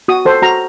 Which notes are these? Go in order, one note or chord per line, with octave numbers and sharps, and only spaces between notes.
F#4 D#6
A4 C5
F#4 A#5